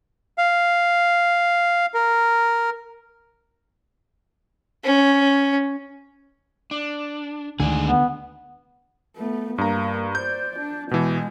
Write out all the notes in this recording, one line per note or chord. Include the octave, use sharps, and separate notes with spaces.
F5
A#4
C#4
D4
D2 D3 D#3 G#3 D4 G#4
B3
A3 B3
G2 A#3 A#5
C5 D5 G6
D4
B2 E3 G#3